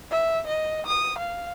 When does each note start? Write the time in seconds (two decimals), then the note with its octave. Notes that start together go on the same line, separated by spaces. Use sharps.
0.11 E5
0.47 D#5
0.86 D#6
1.18 F5